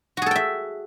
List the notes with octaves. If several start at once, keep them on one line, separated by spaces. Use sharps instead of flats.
F#4 G#4 A4 E5 G5